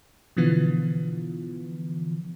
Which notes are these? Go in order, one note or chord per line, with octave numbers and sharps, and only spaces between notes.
B2 D3 E3 F3 B3 F4